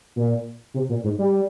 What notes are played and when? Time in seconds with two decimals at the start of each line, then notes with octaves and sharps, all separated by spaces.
0.16 A#2
0.74 C3
0.89 A#2
1.04 G#2
1.19 G3